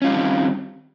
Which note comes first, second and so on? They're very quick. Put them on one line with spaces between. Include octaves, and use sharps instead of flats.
C#4 F4 G3 D#3 C4